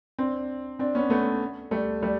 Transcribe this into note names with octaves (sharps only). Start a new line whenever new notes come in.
C4 D4
C4 D4
B3 C#4
A3 B3
G3 A3
G3 A3